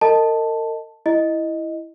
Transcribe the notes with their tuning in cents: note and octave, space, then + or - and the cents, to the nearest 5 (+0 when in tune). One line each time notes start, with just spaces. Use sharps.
A#4 -40 D#5 +0 A5 +0
E4 +0 D#5 +0